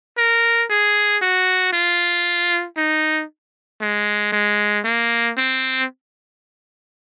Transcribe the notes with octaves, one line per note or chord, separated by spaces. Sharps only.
A#4
G#4
F#4
F4
D#4
G#3
G#3
A#3
C4